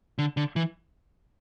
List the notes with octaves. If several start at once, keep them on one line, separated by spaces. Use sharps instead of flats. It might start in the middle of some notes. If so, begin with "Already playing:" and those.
D3
D3
E3